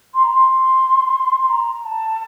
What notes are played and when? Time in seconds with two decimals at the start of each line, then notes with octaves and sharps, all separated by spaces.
0.14 C6
0.23 A#5
0.32 C6
1.41 C6
1.49 A#5
1.85 A5